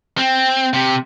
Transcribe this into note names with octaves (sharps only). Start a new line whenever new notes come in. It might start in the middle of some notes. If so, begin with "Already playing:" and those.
C4
C3